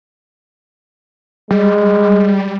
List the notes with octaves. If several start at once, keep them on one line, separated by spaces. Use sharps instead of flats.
G3 G#3